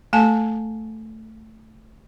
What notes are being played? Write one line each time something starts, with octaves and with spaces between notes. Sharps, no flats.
A3 A4 G#5 A5